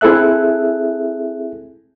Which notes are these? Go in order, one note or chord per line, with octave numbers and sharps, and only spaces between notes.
C4 E4 G#4 A4 E5 F#6